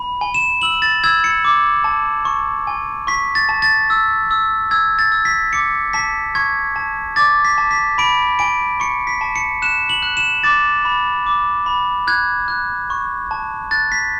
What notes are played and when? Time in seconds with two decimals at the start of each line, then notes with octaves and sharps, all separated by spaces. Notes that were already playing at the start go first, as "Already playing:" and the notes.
Already playing: B5
0.21 G#5
0.34 E7
0.62 E6 F#7
0.82 A6
1.04 E6 G#6
1.24 C#7
1.45 D6
1.84 A5
2.25 C#6
2.67 G#5
3.07 C#6 B6
3.35 A6
3.49 A5
3.62 A6
3.90 E6
4.31 E6
4.71 E6 G#6
4.99 A6
5.12 E6
5.25 B6
5.53 D6 C#7
5.93 A5 B6
6.35 C#6 G#6
6.76 A5
7.16 D6 A6
7.45 B6
7.58 A5
7.71 B6
7.98 B5 D7
8.39 G#5 D7
8.80 C#6 C#7
9.07 B6
9.21 A5
9.36 C#7
9.62 F#6 E7
9.89 F#7
10.03 F#6
10.17 E7
10.43 D6 A6
10.85 B5
11.27 D6
11.66 B5
12.07 F#6 G#6
12.48 F#6
12.90 C#6
13.31 A5
13.71 F#6 A6
13.92 B6